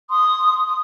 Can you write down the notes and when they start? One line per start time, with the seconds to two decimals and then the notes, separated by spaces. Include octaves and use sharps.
0.09 C6 D#6
0.65 D#6